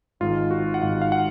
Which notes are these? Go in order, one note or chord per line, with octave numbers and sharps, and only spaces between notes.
G#1 G#2 D#3 F4
F#4
F#5
G#1 G#2 D#3 F5
F5
F#5